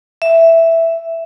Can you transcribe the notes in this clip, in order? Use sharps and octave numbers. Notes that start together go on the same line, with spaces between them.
E5